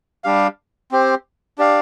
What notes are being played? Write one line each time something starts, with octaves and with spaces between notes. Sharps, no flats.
G3 D4 G4 F5
C4 G4 C5
D4 G4 D5 F5